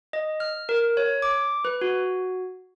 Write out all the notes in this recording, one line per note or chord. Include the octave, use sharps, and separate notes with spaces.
D#5
F6
A#4
C#5
D6
B4
F#4